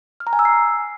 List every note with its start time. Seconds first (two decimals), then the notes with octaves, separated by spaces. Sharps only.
0.20 F6
0.27 A#5
0.33 G#5
0.39 E6
0.45 C7